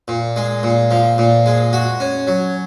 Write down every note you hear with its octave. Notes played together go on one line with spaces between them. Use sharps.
A#2
G#3
A#2
F3
A#2
G#3
F#4
C#4
F#3